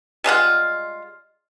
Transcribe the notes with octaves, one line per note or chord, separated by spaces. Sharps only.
G3 G#3 F4 F#5